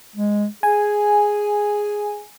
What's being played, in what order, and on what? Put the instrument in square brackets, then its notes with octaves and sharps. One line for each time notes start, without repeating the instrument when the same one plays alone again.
[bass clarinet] G#3
[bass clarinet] G#4 [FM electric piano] G#5